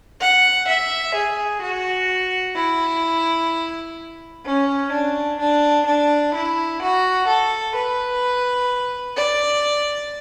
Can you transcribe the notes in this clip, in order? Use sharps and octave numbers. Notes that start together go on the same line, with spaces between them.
F#5
E5
G#4
F#4
E4
C#4
D4
D4
D4
E4
F#4
A4
B4
D5